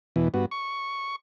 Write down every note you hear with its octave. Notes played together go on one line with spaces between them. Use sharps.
E2 B2 E3
G2 B3 F#4
C#6